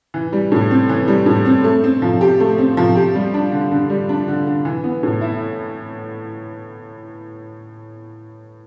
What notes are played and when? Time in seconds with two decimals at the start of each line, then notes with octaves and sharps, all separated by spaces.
0.14 E3
0.33 G3
0.52 A2
0.71 C4
0.89 E3
1.08 G3
1.26 A2
1.45 C4
1.64 A3
1.84 C4
2.02 F3
2.21 G4
2.40 A3
2.58 C4
2.77 F3
2.95 G4
3.15 G3
3.34 D4
3.52 D3
3.71 D3
3.90 G3
4.09 D4
4.28 D3
4.47 D3
4.65 E3
4.84 B3
5.03 A2
5.21 E4